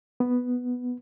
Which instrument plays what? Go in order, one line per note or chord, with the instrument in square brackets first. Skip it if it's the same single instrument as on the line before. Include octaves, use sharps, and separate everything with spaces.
[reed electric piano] B3